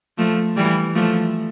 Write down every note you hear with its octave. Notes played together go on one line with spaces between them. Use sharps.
F3 A3
E3 G3
F3 A3